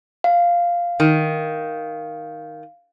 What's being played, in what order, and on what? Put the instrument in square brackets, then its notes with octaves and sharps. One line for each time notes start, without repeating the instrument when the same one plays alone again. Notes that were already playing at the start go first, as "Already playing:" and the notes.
[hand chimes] F5
[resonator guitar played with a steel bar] D#3